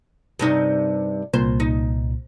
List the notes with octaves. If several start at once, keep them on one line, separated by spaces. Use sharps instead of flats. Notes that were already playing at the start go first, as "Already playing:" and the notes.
G2 C3 D#4
C2 A#2 C5
D#4